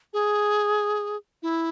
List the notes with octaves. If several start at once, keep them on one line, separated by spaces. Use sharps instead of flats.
G#4
E4